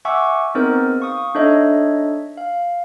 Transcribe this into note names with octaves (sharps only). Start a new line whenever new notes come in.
E5 F#5 G#5 C#6 D6 E6
B3 C4 D#4 G#4 A#4 C5
F5 C#6 D#6
D4 D#4 A4 C#5 D#5 E5
F5